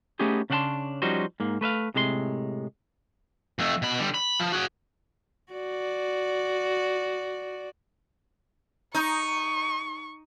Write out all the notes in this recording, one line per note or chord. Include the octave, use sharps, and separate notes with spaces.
A3 B3 C#4 D#4 G4 G#4
C#3 C#4 D4 F#5 A5 C6
F3 G3 C#4 D#4 F#4 C5
G#2 A#3
A3 B4 E5 F5
A2 C3 G#3 C#5 C6
F2 A3
B2 B5
D3 G3
B5
F3
F#4 G#4
F#4 D5
D#4 C#6